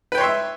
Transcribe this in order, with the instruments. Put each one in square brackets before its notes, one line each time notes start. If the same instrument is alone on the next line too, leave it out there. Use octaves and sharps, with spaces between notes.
[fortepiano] B4
G5
C#5
C6
E5